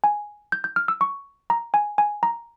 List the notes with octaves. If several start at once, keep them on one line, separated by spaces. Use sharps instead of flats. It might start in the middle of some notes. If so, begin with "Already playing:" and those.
G#5
G6
G6
F6
E6
C#6
A#5
G#5
G#5
A#5